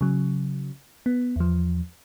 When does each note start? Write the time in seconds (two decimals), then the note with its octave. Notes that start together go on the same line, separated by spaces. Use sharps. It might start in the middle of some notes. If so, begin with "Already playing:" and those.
0.01 C#3 F#3
1.06 B3
1.36 E2 F3